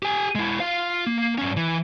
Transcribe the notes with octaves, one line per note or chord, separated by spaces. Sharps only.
G4 G#5
G#3 E4
F4 F5
A#3
G2 C#4
E3